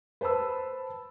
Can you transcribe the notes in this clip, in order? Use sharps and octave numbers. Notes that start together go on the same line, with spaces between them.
B4 C5 A5 B5 E6